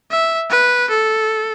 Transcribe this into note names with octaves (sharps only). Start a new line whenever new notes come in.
E5
B4
A4